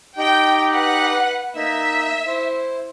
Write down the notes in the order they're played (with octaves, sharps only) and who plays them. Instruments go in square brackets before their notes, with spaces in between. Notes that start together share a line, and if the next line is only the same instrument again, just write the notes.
[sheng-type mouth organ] D#4 G4 [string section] G5
[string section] B4 F#5 F#6
[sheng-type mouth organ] A#3 D#4 E6 [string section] E5
[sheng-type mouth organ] E4 C5